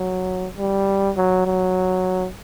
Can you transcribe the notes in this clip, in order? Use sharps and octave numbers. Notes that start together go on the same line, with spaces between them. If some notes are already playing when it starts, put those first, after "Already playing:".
Already playing: F#3
G3
F#3
F#3